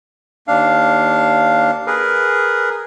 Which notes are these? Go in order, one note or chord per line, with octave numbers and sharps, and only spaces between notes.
D#2 D4 F5
G#4 A#4 B4